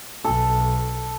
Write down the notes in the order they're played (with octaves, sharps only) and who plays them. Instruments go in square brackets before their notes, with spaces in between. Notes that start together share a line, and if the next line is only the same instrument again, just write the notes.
[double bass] B1 [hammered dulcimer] A4